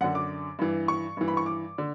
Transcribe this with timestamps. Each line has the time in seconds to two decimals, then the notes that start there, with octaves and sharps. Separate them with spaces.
0.01 F#2 D3 F#5
0.15 D6
0.59 G2 E3
0.88 C#6
1.17 G2 E3
1.28 B5
1.37 C#6
1.46 D6
1.78 D3